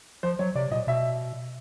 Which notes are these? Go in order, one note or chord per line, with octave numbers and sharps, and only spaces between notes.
F3 C5
F#3 C#5
C3 D5
A#2 D#5
B2 E5